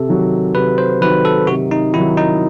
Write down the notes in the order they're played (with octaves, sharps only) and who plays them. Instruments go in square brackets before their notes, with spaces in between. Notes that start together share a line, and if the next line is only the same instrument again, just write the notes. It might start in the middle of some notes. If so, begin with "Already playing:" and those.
Already playing: [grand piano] C3 [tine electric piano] A4
[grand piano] D#3 F#3
[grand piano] C3 [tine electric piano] B4
[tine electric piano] C5
[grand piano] D#3 F#3 [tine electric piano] B4
[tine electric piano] A4
[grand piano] C3 [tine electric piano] F#4
[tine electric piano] D#4
[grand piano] D#3 [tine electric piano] E4
[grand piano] F#3
[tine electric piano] D#4